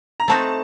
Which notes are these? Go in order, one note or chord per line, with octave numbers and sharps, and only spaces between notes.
A#5
A3 C4 D#4 F#4 A5